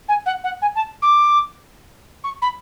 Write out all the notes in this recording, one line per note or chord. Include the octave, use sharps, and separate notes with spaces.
G#5
F#5
F#5
G#5
A5
D6
C#6
B5